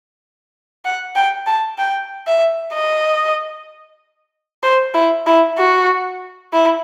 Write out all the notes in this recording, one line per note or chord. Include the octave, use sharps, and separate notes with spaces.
F#5
G5
A5
G5
E5
D#5
C5
E4
E4
F#4
E4